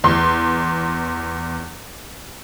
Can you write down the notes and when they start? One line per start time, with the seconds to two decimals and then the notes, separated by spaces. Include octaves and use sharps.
0.04 E2 C6